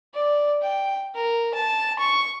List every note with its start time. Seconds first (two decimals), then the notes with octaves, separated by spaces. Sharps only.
0.14 D5
0.62 G5
1.15 A#4
1.54 A5
1.99 C#6